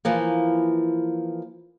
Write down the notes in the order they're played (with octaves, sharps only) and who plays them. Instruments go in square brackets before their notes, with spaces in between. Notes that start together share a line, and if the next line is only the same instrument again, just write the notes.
[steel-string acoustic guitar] E3 F3 A#3